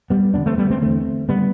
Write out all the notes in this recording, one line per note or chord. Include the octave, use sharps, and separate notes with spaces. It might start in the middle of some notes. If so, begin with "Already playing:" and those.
G3 B3
E2 D3 B3 D4
A3 C4
G3 B3
A3 C4
E2 D3 A3 C4
D3 G3 B3